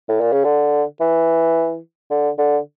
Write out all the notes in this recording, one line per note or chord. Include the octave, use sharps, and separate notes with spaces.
A2
A#2
C#3
D3
E3
D3
D3